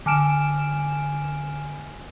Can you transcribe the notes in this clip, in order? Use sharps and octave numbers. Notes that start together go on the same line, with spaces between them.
D3 G#5 F6 D7 E7